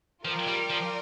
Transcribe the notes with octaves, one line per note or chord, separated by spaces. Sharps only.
F3 F4 A#4 D5 G5
G3
F3